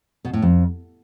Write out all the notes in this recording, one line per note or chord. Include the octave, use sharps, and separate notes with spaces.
B2
A2
F2